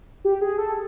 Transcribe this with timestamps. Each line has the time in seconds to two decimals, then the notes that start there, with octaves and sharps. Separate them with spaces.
0.25 G4
0.41 G#4
0.58 A4